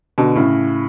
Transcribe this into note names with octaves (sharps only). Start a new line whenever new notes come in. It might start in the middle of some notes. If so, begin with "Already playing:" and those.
B2 D3
A2 C#3